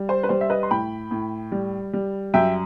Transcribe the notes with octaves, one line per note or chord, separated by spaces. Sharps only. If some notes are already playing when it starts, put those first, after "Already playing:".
Already playing: G3
C5
B4
G3 C5
E5
B4 D#5
C6
A2 G5 B5
A2
G3
G3
F#2 E5 G5